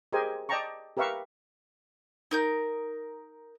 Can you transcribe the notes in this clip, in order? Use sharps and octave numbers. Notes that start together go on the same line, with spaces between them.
G4 G#4 A#4 C5 D#5 G#5
D5 D#5 G5 A5 A#5 C#6
G4 A#4 B4 E5 F5 C#6
D#4 A#4 G6